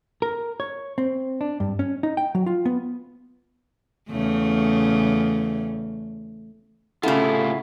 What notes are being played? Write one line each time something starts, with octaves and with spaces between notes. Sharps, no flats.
A#4
C#5
C4
D4
G2
C#4
D#4
G5
F#3
F4
B3
E2 C#3 A3
A2 C#3 C#4 E4 F4 A4 F#5